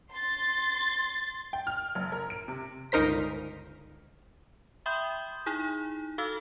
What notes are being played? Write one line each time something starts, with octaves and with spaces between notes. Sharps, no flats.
C6 A6
G5
F6
F#1
A#4
D7
C3
G1 C#2 D#4 A#4 C5 B6
E5 G5 B5 C6 D#6 G6
D#4 E4 G#4
F#4 A4 F5 E6 F6